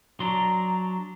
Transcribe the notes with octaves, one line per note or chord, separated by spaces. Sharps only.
F#3 D4 A#5 C6